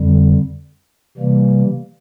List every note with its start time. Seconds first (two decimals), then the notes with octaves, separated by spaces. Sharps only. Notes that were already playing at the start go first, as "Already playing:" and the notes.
Already playing: F2 D3 G3
1.18 C3 E3 G3 A#3